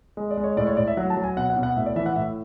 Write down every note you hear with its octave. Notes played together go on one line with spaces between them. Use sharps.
G#3
D5
G#3
C#5
A2 D5
C#5
A2 D5
E5
F#3 F#5
A5
F#3
G#5
B2 F#5
F#5
B2
F#5
A2 E5
D5
E3 E5
F#5
A2 E5